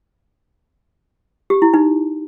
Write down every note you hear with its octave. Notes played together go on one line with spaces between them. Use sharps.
G4
E4
D#4